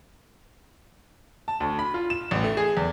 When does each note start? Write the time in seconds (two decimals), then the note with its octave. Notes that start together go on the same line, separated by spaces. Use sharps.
1.48 A5
1.60 D2
1.79 B5
1.94 F4
2.10 E7
2.31 A1
2.44 A3
2.57 G#4
2.77 E2